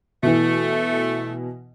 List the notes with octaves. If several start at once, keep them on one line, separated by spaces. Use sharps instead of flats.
B2 E3 A3